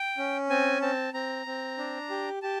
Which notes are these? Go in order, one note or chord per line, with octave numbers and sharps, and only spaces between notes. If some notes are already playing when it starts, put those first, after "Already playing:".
Already playing: G5
C#4
C4 G#5
C4 A5
C4 A#5
C4
D4
G4
G4 A5